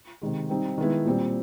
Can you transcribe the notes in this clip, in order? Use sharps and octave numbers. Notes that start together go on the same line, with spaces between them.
C3 D#3 G#3
G3 C4 D#4
D#3 G#3 B3 E4
A#2 G3 C4